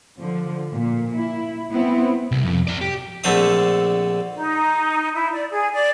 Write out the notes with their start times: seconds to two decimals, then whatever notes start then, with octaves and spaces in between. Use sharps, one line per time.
0.19 D3 F3
0.73 A#2
1.15 E4
1.71 B3 C4 E4
2.32 C2
2.45 F2
2.67 C4 D5
2.81 G4
3.24 A#1 D3 A3 C4 E5 D#6
4.36 D#4
5.14 E4
5.32 D5
5.52 G#4
5.74 D5